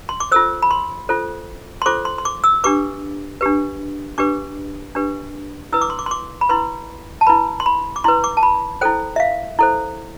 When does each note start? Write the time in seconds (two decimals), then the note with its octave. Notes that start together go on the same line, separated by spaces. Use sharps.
0.09 C6
0.20 D6
0.32 F4 A4 C5 E6
0.62 B5
0.71 C6
1.09 F4 A4 C5
1.82 C6
1.86 F4 A4 C5 D6
2.05 C6
2.18 C6
2.25 D6
2.44 E6
2.64 D4 G4 B4 D6
3.41 D4 G4 B4
4.18 D4 G4 B4 D6
4.95 D4 G4 B4
5.72 E4 B4 E6
5.81 D6
5.90 C6
5.99 D6
6.06 C6
6.11 D6
6.41 B5
6.49 E4 B4 C6
7.21 A5
7.27 E4 B4 B5
7.60 C6
7.66 B5
7.96 D6
8.04 E4 B4 C6
8.24 D6
8.37 A5
8.43 B5
8.81 E4 A4 C5 G5
9.16 E5
9.20 F5
9.59 E4 A4 C5